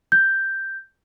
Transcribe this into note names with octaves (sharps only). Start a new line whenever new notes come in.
G6